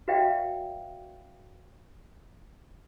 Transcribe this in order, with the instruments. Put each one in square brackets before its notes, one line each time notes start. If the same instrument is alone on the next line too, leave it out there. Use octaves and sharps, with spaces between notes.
[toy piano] F#4 B4 D5 E5 F5 G5